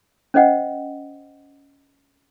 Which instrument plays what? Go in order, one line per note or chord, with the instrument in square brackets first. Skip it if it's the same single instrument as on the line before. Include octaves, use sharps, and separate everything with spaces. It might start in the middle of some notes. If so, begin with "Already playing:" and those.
[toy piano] C#4 C5 D#5 F#5 G5